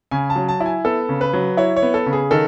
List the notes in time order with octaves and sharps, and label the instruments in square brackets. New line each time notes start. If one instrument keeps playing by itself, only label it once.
[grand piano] C#3 G#5
A5
F#3
A5
E4
G#5
B3 A4
C#3
B4
F#3
E4 C#5
C#5
B3
A4
C#3
G#4
D#3 A4